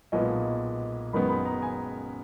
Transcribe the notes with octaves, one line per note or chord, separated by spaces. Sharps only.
B1 A#2 G#3 B3 D#5
F#1 F#2 D#3 G#3 B3 B5
B5
A#5
G#5